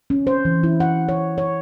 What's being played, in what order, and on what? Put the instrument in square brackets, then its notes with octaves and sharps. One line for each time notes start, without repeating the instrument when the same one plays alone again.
[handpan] C#4
C5
E3
E4
F#5
C#5
C#5